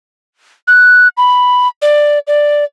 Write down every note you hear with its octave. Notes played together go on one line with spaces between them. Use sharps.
F#6
B5
D5
D5